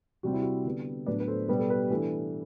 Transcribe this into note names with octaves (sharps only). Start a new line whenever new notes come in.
C3 G3 C4 F#4
E4
F#4
D3 G3 B3 D4
A2 F#3 B3 D4 B4 D5
B4
A4 C5
B2 G3 B3 B4
A4
G4 B4
E3 A3 D4